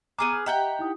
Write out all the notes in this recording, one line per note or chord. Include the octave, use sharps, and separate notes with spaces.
B3 G#4 A#5 D6 F6 D#7
F6
G4 D#5 E5 F#5 G5 A#5
D#4 E4 D#6